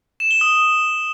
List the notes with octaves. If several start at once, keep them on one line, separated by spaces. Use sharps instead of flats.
E7
G7
D#6